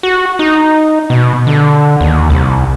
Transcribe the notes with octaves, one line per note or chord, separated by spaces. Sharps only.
F#4
D#4
B2
D3
D#2
C2